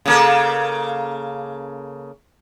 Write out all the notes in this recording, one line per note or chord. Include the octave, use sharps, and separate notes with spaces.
C#3 A#3 A4